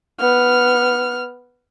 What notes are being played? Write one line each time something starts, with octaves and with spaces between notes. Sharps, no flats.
B3 F6